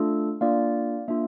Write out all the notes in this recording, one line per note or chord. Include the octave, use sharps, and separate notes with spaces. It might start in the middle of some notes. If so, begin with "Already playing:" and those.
Already playing: A3 D4 F4 A4
A#3 D4 F4 D5 F5
A#3 D4 F4 E5